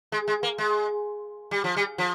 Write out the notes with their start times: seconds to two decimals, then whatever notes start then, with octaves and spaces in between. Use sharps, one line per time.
0.12 G#3
0.28 G#3
0.43 A#3
0.58 G#3
1.51 G3
1.64 F3
1.77 G3
1.98 F3